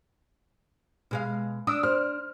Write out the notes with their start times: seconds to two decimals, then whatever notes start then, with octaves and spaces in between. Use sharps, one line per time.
1.11 B2 G#3 F5
1.67 D4 D#6 E6
1.83 C5 F6